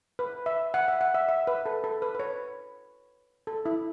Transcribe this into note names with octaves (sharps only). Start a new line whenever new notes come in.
B4
E5
F#5
E5
F#5
E5
E5
B4
A4
A4
B4
B4
C#5
A4
E4